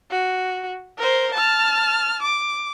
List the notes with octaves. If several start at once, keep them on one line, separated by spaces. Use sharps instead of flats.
F#4
A#4 C5
A5 F6
D6